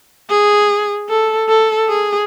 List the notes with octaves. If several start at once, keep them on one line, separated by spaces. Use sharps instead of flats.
G#4
A4
A4
G#4